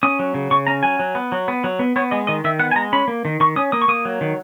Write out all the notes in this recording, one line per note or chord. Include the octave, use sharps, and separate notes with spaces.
C#4 D#6
F#3
C#3
C#3 C#6
C#4 A#5
F#3 G#5
F#3
B3
F#3
B3
F#3
B3
B3 C#5
G#3 D#5
D#3 D#5
D#3 E5
B3 F#5
G#5
G#3 A#5
C#4 B5
A#3
D#3
D#3 C#6
C#4 D#6
A#3 D#6
C#6
A#3 D#6
F#3
D#3